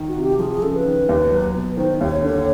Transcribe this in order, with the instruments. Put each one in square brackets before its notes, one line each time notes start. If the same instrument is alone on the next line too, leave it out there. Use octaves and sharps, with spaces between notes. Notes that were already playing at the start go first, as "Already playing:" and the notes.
Already playing: [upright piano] D#3
[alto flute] F#4
[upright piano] C3
[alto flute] G4
[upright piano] F3 [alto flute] G#4
[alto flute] G#4
[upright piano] C#3 [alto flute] A4
[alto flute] B4
[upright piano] D#3
D#2
F#3
B2
[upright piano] D#3 [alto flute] C5
[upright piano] D#2 [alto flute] C#5
[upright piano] D3 [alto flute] C#5